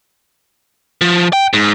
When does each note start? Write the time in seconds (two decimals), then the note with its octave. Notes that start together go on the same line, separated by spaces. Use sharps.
1.01 F3
1.33 G5
1.53 G#2